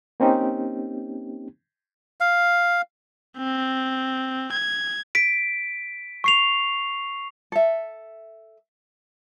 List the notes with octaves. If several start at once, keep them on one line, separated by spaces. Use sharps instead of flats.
A#3 C4 C#4 D#4 G4
F5
C4
G#6
B6 D7
C#6 C7 F7
A4 E5